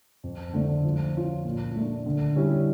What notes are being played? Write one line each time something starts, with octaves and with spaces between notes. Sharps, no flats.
F2
D3 A3 D4
F3
C#4 F4
A#2
A3 D4
D3
G3 C#4 E4